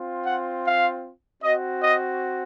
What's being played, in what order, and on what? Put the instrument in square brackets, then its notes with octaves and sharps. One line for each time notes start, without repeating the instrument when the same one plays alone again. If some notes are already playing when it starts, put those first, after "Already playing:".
Already playing: [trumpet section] C4 F4
F#5
F5
C4 F#4 D#5
D#5